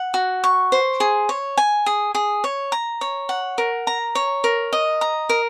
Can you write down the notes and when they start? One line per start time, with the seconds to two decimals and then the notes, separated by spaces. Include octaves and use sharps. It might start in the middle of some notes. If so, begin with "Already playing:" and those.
Already playing: F#5
0.14 F#4
0.44 C#6
0.72 C5
1.00 G#4
1.29 C#5
1.57 G#5
1.86 G#4
2.15 G#4
2.44 C#5
2.72 A#5
3.01 C#5
3.29 F#5
3.58 A#4
3.87 A#5
4.15 C#5
4.44 A#4
4.73 D#5
5.01 A#5
5.29 A#4